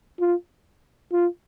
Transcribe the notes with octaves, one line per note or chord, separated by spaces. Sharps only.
F4
F4